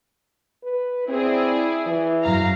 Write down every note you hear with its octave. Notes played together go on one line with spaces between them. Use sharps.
B4
C4 E4 G#4 D5
E3
F#2 F5 A#5